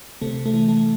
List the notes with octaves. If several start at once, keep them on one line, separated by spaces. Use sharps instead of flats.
C3 A3
A3
E3
A3